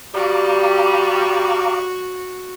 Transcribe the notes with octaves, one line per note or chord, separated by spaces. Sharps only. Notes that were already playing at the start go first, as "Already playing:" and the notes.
G3 F#4 F5 A#5 D6